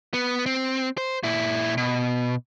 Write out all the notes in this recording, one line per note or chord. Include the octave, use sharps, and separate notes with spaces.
B3
C4
C5
A#2 E4
B2